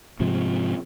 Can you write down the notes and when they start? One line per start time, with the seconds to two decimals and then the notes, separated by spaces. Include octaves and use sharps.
0.20 G#2 C3 F3